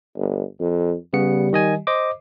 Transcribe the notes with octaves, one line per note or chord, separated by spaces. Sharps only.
G1
F2
C#3 G3 B3 C#7
D#3 D#5 G#5
C5 D#5 D6